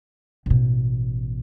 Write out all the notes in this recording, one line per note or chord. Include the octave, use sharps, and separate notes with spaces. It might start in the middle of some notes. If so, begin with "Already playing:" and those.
A1 B2